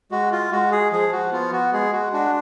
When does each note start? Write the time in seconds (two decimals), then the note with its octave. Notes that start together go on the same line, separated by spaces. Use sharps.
0.11 G#3 F#4
0.32 F4
0.52 G#3 F#4
0.72 G#4
0.92 F3 G#4
1.12 F#4
1.32 B3 F4
1.53 F#4
1.73 G#3 G#4
1.93 F#4
2.13 D4 F#4